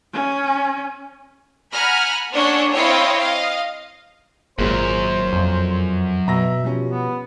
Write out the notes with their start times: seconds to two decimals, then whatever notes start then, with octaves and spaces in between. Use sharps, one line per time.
0.13 C#4
1.73 F#5 G#5 A#5 B5 F6 F#6
2.33 A#3 C#4 D4 A4 C#5 F#5
2.75 C4 E4 C#5 D#5 F5 G5
3.17 D#5 F5
4.59 G#1 F#2 A#2 G#3 A#3 C5
5.33 F2
6.28 B2 E5 A#5 A#6
6.64 F3 G3 C#4
6.91 B3